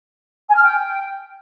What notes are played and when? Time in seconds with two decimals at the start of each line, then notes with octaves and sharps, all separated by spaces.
0.48 G#5
0.55 F6
0.62 G5